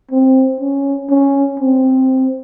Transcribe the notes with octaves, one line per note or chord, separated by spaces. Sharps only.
C4
C#4
C#4
C4